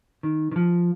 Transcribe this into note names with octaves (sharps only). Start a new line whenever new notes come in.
D#3
D#3
F3